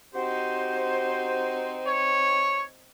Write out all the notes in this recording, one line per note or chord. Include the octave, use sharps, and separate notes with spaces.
C4 D#4 F#4 G4 C5
C#5